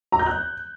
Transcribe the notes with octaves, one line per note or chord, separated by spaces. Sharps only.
A#5
G6
F#6